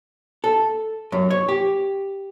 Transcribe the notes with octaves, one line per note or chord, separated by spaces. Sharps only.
A4
F#2
C#5
G4